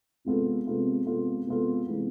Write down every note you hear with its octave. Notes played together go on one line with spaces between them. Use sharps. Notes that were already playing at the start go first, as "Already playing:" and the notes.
C3 G#3 B3 F4 A4
C3 G#3 B3 F4 A4
C3 G#3 B3 F4 A4
C3 G#3 B3 F4 A4
C3 E3 G#3 B3